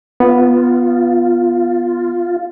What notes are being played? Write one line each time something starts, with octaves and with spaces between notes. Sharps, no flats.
B3 F4